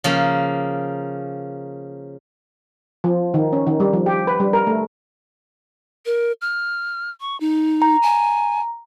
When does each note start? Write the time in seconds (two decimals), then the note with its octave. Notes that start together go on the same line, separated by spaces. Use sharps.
0.04 C#3 F3 A#3
3.04 F3
3.34 D#3
3.53 C#4
3.67 D#3
3.80 G3
3.93 F3
4.06 G4
4.27 B4
4.40 G3
4.53 A#4
4.67 A3
6.05 A#4
6.41 F6
7.20 C#6
7.40 D#4
7.82 A#5
8.03 G#5